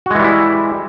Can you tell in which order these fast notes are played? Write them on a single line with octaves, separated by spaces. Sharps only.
F#4 G#3 E3 G3 E4